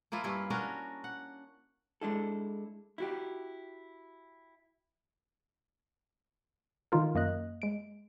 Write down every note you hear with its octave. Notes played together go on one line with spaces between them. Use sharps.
F3 A#3 E4 F4
G2 C#4 E4 F4
C#4 D4 F#4 A#4
F#5
G#3 D4 E4 A4
E4 F#4 G4
D3 D#3 D#4 F4 A#4
F#2 A#3 D#5 F#6
G#3 D7